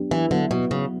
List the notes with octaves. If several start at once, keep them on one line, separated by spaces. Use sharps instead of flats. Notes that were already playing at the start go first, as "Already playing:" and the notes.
Already playing: F#3 B3 D4 G4
E3
D3 F#3 B3 F#4
B2
C#3